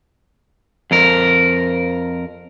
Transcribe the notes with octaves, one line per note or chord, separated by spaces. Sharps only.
F2 A#4